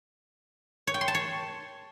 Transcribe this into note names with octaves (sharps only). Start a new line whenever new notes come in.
C#5
G5
C6
A5
C#5